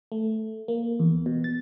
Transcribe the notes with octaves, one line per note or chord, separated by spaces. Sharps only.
A3
A#3
E2
B2
A6